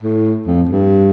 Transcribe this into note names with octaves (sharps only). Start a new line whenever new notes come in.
A2
F2
G2